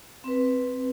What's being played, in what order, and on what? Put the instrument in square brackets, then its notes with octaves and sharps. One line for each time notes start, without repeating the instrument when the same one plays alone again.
[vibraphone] C4 B4